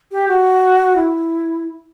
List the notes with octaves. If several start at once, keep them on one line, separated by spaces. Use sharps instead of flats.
G4
F#4
E4